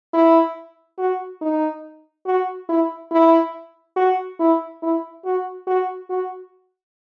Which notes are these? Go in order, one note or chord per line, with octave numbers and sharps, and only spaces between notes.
E4
F#4
D#4
F#4
E4
E4
F#4
E4
E4
F#4
F#4
F#4